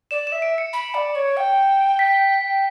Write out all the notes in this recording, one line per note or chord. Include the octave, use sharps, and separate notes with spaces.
D5 E7
E5 E7
D7
C#7
B5
D5
C#5
G5
B6